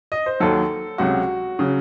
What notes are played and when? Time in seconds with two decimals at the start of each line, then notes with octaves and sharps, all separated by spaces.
0.12 D#5
0.26 C5
0.40 D#2 D#3 F#3 A4
0.98 C#2 C3 F#3 F#4
1.59 C#3 F#3